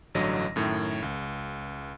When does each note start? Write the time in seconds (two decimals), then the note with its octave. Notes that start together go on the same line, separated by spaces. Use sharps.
0.15 A1 G2 D3 F#3 D#5 A#6
0.56 F#2 A2 D#3
1.02 C#2